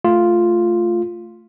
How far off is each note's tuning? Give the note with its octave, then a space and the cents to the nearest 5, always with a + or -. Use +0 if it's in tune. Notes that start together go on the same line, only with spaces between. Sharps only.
A3 +0 F4 +0